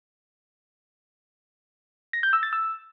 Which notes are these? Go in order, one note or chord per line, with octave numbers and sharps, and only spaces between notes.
A#6
G6
E6
A6
E6